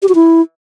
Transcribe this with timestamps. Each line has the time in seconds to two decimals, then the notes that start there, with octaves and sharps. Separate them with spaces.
0.02 G4
0.09 F#4
0.15 E4